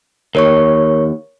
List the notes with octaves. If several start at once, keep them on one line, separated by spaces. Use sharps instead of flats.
D#2 A#4 C#5 C#6